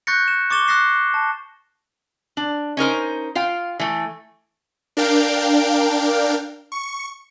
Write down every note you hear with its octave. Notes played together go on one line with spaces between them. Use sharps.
C#6 F#6 G6 A6 A#6 C#7
E7
C#6 D6 A6 E7 G7
D#6 F#6 A6 A#6 C7 E7
A5
D4
C#4 D#4 A#4 C5
F4 F5 G5
E3 A3
D4 A#4 F5 G5
C#6